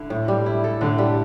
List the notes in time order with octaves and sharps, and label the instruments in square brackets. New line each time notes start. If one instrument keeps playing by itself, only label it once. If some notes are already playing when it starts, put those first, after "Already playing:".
Already playing: [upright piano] D3 [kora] E4
[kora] A2
G3
E4
A4
[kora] A2 [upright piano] D3
[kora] G3